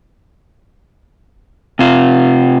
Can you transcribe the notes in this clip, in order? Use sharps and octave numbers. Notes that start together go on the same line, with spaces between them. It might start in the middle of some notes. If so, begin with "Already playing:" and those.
C3 F4